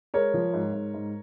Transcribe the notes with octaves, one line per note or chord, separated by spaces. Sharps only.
G#3 A#4 C#5
F3
G#2
G#2
G#2